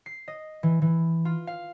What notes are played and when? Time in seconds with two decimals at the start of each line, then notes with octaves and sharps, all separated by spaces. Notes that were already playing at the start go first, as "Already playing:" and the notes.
0.06 C7
0.28 D#5
0.63 E3
0.82 E3
1.25 F4
1.47 F5